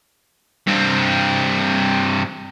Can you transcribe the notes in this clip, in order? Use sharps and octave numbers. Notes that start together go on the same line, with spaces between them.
G2 C4